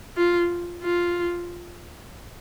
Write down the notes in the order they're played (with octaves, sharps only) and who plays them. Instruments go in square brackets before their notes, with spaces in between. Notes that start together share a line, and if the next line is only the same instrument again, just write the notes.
[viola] F4
F4